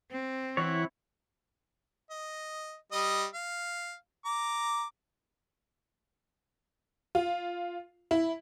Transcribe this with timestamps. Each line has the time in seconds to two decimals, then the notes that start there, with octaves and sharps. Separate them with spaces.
0.11 C4
0.57 E3 E4 C#5 F#5
2.10 D#5
2.92 G3 D#5 D#6
3.34 F5
4.26 A#5 D6
7.15 F4
8.11 E4